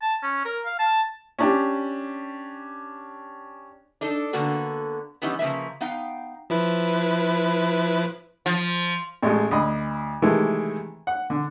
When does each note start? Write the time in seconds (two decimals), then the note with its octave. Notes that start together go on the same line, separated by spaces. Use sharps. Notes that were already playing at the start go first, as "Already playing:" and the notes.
0.02 A5
0.23 C#4
0.45 A#4
0.65 F5
0.79 A5
1.39 C#4 D4 G4
4.01 D4 D#4 A4
4.33 D3 A#3 B3 F#4 A4
5.22 D#3 E3 G3 B3 C#4 D#4
5.39 C#3 F3 G#3 A#3 B4 E5
5.81 B3 D#4 F5 G5
6.50 F3 E4 B4
8.46 F3
9.22 A1 G#3 A3
9.51 D2 D#5 B5
10.22 C3 D#3 E3 G#3 A3
11.07 F#5
11.30 D3